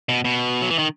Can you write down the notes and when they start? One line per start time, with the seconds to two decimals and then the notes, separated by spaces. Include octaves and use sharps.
0.09 B2
0.25 B2
0.62 F#3
0.70 E3
0.78 D#3